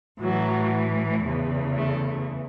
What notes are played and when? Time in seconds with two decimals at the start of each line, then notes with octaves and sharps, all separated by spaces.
0.20 A2 E3 F#3
1.24 E2 C#3 E3
1.77 A3